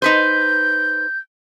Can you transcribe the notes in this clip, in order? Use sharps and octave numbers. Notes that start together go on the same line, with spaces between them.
D#4 B4 C5 G6